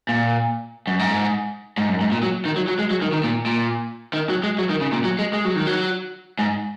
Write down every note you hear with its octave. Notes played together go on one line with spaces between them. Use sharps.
A#2
F#2
G#2
G#2
F#2
G#2
A#2
F#3
D#3
F#3
F#3
G#3
F#3
D#3
D#3
A#2
A#2
D#3
F#3
G#3
F#3
D#3
C#3
A#2
F#3
G#3
G#3
F#3
D#3
F#3
G#2